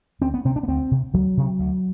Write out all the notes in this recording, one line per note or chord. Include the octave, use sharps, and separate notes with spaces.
D2 C4
B3
C3 C4
D4
B3
D2 C4
C3
D2 F#3
C3
D2